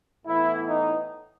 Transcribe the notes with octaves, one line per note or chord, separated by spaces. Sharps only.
A2 E3 B3 E4
D#4